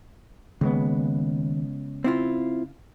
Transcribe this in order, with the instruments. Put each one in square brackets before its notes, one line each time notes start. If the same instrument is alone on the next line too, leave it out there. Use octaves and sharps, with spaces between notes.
[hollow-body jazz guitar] D#2 [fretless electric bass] C#3 G#3 B3
[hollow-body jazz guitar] C4 E4 F4